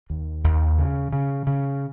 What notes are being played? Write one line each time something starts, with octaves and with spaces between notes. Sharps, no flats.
D#2
D#2
C#3
C#3
C#3